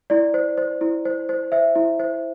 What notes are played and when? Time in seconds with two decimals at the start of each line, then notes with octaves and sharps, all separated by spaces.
0.10 E4 D5
0.34 C5
0.57 C5
0.81 E4
1.05 C5
1.29 C5
1.52 C5 E5
1.75 E4
2.00 C5